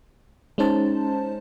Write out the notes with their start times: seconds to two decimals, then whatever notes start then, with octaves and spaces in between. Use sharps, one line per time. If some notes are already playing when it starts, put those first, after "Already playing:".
0.58 G#3 C#4 D#4 C5 A5